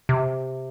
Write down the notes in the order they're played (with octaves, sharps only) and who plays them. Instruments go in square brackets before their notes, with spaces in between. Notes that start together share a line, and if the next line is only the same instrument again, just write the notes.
[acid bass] C3